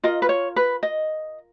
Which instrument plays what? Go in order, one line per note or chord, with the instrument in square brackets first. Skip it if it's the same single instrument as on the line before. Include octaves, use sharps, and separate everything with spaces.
[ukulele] F4 A#4 D#5
B4
C#5
B4
D#5